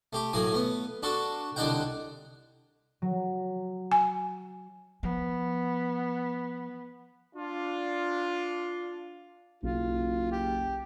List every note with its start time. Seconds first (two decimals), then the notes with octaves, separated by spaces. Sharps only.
0.13 A3 G4
0.33 A2 F#3 A#3 G#5 D#6
0.52 A3 B3
1.03 D4 F#4 A4 C#6
1.56 C2 D3 D4 D#4 F#5 G5
3.02 F#3
3.92 G#5
5.03 F3 B3
7.36 D4 F4
9.63 F#1 B1 F4
10.32 G4